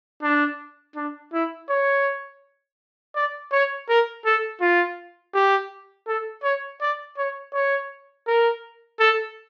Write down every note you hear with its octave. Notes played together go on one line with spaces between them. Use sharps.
D4
D4
E4
C#5
D5
C#5
A#4
A4
F4
G4
A4
C#5
D5
C#5
C#5
A#4
A4